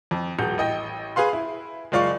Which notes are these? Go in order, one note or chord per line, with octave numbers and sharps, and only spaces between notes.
F2
D#1 F#4 G#4 G6
A1 D#5 G5
G#4 B4 F5 C6
E4
F#1 G#3 F4 D5 F5 C#6